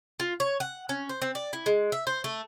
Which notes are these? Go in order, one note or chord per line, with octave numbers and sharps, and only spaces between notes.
F4
C#5
F#5
C#4
C5
C4
D5
E4
G#3
E5
C5
A3